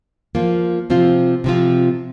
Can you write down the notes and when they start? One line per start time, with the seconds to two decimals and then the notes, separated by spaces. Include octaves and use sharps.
0.35 F3 A#3 F4
0.90 C3 F3 C4 F4
1.44 C3 F3 C4 F4